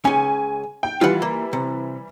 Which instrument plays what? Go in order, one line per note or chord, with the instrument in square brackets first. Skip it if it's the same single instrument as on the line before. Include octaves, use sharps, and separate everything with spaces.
[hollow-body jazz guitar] C#2 C#4 [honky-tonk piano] G#5
[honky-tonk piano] G5
[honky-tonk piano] E3 G3 [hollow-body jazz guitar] F4 F#5
[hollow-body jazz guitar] A#3
C3